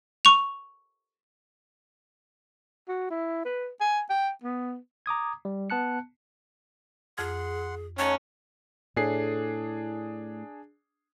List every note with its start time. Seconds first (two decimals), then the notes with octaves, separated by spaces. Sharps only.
0.25 C#6 F7
2.88 F#4
3.10 E4
3.45 B4
3.80 G#5
4.10 G5
4.43 B3
5.06 A#5 D6 D#6 G#6
5.45 G3
5.70 B3 A5 F#6 C#7
7.18 F2 G#4 F#5 C6 F6 G#6
7.99 A3 C#4 D#4 C#5 F#5
8.96 A2 D4 G#4 C7